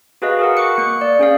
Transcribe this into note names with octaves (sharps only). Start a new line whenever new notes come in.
F#4 G#4 B4 D#5 F5
G#4 A#4 F#5
C#6 D6 F#6 C#7
A#3 C#7
D5
C#4 G#4 F5